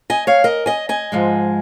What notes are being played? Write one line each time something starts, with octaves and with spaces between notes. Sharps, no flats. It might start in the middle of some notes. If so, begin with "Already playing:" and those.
D#5 G#5
C#5 F5
A#4 D#5
D#5 G#5
D#5 G#5
G#2 F3 G#3